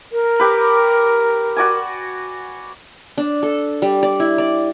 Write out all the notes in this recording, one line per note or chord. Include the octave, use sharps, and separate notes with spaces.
A#4
G4 B4
F#4 D5 G#5
D4
A4
G3
D5
E4
D5